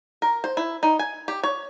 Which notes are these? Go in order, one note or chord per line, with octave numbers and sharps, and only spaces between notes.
A#4
C5
E4
D#4
G#5
G4
C#5